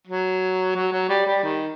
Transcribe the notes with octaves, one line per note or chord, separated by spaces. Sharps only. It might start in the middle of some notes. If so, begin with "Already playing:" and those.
F#3
F#3
F#3
G3
G3
D#3